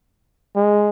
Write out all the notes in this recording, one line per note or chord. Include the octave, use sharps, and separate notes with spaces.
G#3